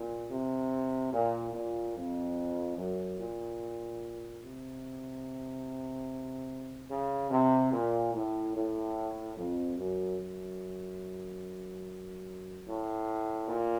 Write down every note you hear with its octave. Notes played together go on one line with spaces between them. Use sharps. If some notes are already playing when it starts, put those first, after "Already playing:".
Already playing: A#2
C3
A#2
A#2
F2
F#2
A#2
C3
C#3
C3
A#2
A2
A2
F2
F#2
F#2
A2
A#2